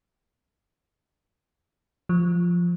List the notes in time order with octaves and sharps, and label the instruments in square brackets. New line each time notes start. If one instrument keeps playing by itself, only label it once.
[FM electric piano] F3